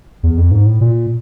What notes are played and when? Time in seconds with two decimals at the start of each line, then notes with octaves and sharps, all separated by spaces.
0.23 E2
0.37 F2
0.51 G#2
0.66 A2
0.81 A#2